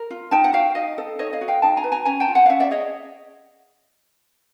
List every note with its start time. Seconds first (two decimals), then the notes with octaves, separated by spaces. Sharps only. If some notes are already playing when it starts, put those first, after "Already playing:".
Already playing: A#4
0.10 F4
0.31 D#4 G5 A5
0.44 F#5
0.53 F#4 F5 G5
0.75 D#4 D#5 F5
0.98 A4
1.19 D#4 C#5 D#5
1.33 D#5 F5
1.41 F#4
1.48 F5 G5
1.62 D#4 G5 A5
1.77 G#5 A#5
1.84 B4
1.92 G#5 A#5
2.05 C#4 G#5 A#5
2.20 G5 A5
2.28 F4
2.35 F#5 G#5
2.46 F5
2.49 C#4 E5 F#5
2.60 D5 E5
2.71 G#4 C#5 D#5